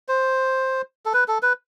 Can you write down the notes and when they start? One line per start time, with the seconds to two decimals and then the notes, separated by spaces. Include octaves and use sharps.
0.08 C5
1.05 A4
1.14 B4
1.28 A4
1.42 B4